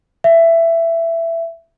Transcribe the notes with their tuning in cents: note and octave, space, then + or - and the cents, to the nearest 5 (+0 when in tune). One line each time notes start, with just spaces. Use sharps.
E5 +15